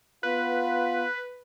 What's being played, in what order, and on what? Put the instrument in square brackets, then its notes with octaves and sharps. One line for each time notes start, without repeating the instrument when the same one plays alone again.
[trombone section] B3 F4 [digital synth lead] B4